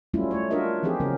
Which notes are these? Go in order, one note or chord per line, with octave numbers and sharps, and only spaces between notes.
F#3 G3 A3 C#4 E4 F4
A3 C#5
D4 F4 F#4 A#4 D#5 E5
E3 F3 C4 D#4 G4 G#4
C#3 F#3 B3 C#4 A#4